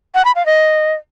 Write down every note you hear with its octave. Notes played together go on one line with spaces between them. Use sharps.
F#5
B5
F5
D#5